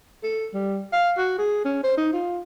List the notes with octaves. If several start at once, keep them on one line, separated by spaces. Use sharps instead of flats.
A4
G3
F5
F#4
G#4
C#4
C5
D#4
F4